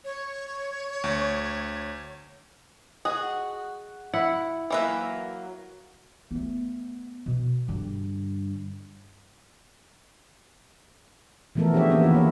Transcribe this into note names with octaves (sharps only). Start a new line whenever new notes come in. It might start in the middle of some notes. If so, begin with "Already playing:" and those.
C#5
D2
F#4 G#4 D#5
E4 F#5
E3 F#3 A#3 A#4 E5
A3 B3
B2
G2 D3
E3 F3 A3 B3 A4 A#4
D4 G4 G#4 C#5 E5
E3 A#3 B3 C#4 E4
D#3 E3 F4 G#4 A#4
A#3 E4 C#5